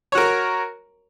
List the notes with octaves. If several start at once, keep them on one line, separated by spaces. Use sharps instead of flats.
F#4 A#4 C#5